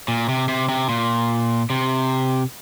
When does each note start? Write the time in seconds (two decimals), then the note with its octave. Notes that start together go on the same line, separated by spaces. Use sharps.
0.08 A#2
0.29 C3
0.48 C3
0.69 C3
0.89 A#2
1.70 C3